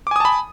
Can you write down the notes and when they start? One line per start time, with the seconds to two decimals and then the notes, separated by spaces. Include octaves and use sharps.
0.07 D6
0.11 G#5
0.16 D#6
0.20 A5
0.25 B5